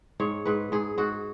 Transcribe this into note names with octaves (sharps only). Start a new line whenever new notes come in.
G#2 C#5
G#2 B4
G#2 G#4
G#2 F#4